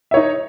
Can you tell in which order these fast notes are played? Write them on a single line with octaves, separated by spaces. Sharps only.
E5 C#5 D#4